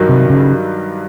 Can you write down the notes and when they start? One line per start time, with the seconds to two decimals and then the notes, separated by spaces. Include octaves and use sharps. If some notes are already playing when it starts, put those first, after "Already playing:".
Already playing: G2 D#3 F#3
0.09 C3
0.30 C#3